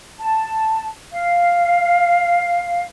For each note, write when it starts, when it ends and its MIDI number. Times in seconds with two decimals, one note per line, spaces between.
0.20 0.88 81
1.12 2.84 77